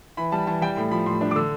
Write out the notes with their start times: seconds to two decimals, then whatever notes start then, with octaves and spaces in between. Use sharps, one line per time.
0.17 E3 B5
0.32 G3 A5
0.47 E3 A5
0.62 G3 G5
0.77 A2
0.91 F3 B5
1.06 A2 C6
1.21 D4
1.31 D6
1.36 D3 E6